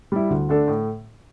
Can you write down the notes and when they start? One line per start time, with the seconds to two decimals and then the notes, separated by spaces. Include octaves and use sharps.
0.12 G3 E4
0.30 D2
0.49 D3 A3 D4 A4
0.68 A2